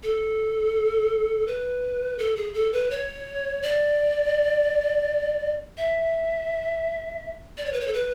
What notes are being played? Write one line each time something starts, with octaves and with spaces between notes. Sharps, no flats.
A4
B4
A4
G#4
A4
B4
C#5
D5
E5
D5
C#5
B4
C#5
A4
B4